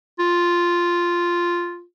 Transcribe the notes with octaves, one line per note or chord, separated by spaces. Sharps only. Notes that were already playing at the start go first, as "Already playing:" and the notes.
F4